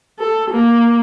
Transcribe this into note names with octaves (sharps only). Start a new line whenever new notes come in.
A4
A#3